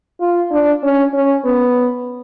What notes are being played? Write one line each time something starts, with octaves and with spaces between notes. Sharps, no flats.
F4
D4
C#4
C#4
B3